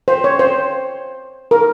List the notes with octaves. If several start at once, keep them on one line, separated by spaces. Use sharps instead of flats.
C5
C#5
C5
A#4